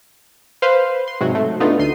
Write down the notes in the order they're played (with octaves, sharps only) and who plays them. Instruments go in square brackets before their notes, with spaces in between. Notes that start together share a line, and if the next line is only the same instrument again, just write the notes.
[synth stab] B4 C5 F5 C6
C6
G#2 C3 F#3 F#4
A3
A3 B3 D4 D#4 F4
D2 C6 C7 D#7